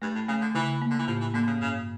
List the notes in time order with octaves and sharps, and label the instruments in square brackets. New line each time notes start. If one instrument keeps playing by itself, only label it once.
[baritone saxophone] G2 [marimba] A3
[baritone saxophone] A2
[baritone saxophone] C#3 [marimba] A3
[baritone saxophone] D3
[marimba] C#3 [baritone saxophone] E3
[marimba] A#3
[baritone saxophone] D3
E3
[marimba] A2 [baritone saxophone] F3
[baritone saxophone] E3
[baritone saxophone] D3 [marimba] A#3
[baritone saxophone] C#3
[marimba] G2 [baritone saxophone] C#3